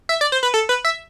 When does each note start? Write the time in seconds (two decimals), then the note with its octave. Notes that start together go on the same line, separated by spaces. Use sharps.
0.09 E5
0.21 D5
0.32 C5
0.43 B4
0.54 A4
0.69 B4
0.85 E5